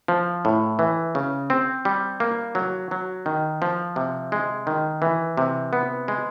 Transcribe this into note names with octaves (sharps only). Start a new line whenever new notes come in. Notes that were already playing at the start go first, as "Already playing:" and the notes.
F3
A2
E3
C#3
C4
G3
A#3
F#3
F#3
D#3
F3
C3
G#3
D#3
E3
C3
B3
G#3